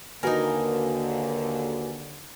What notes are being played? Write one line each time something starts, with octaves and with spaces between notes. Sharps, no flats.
D#2 D3 A#3 D#4 F#4 A#4 B4 G#5